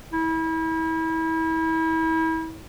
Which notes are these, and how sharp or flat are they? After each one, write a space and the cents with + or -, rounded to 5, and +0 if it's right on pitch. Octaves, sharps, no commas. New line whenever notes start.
E4 -35